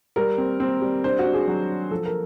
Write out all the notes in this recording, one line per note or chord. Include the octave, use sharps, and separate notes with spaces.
G3 A#4
C4
C4
G3
D4 C5
F#4
D4
G#4
F#3
D4
F3 A4
A#4